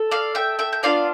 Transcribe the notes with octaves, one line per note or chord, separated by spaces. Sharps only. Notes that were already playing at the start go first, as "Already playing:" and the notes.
Already playing: A4
D5 F5
E5 G5
E5 G5
G5
B3 D4 F4 D5 F5